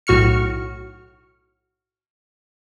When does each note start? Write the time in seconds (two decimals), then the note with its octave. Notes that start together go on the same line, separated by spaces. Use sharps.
0.07 B1 A2 F#4 C#6 F6 C#7